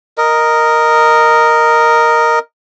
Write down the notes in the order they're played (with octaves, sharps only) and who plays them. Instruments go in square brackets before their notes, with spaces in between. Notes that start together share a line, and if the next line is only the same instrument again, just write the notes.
[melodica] A#4 D#5